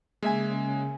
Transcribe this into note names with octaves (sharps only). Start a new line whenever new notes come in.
C#3 G#3 A#3 E5 G#5